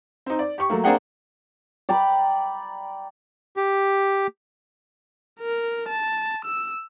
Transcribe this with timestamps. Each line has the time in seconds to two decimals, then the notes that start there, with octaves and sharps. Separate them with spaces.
0.26 C4 D#4
0.39 D5
0.58 G4 C#6
0.70 F#3 A3 A#3
0.84 A#3 C4 D4 G#4 F#5 G5
1.89 D5 G5 A#5 B5
3.57 G4
5.40 A#4
5.89 A5
6.45 E6